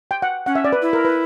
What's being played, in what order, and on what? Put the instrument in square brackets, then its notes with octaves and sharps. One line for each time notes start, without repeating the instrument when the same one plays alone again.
[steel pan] G5
F#5
[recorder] C#4 [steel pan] F#5
[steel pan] E5
D5
B4
[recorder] E4
[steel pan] A#4
B4